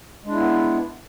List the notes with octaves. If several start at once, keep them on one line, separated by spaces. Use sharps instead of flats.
G#3 B3 D4 E4